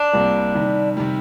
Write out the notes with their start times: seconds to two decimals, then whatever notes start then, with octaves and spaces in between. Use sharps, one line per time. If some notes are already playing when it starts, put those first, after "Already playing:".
Already playing: D4
0.13 C2 C3 G3 A#3
0.55 C3 D#3 G3
0.97 C3 D#3 G3